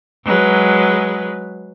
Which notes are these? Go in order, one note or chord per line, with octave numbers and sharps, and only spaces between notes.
F#3 G#3 B4